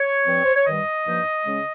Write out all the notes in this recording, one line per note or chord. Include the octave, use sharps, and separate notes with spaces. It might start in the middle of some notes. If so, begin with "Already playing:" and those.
Already playing: C#5
G2 F3 C4
C5
C#5
G2 D#3 G3 D#5
G2 F3 A#3 D#4
C#3 G#3 C#4